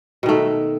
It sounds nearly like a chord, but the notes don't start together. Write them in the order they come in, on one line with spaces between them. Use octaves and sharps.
B2 D#3 A3